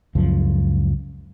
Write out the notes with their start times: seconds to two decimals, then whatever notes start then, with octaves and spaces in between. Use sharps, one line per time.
0.15 C#2 F#2 F3